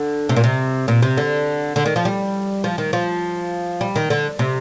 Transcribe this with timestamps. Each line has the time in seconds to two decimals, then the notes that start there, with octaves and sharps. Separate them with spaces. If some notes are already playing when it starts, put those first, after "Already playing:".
Already playing: D3
0.29 C3
0.36 A#2
0.44 C3
0.88 A#2
1.02 C3
1.17 D3
1.76 D3
1.86 D#3
1.96 F3
2.05 G3
2.64 F3
2.78 D#3
2.93 F3
3.81 G3
3.96 D#3
4.10 D3
4.39 C3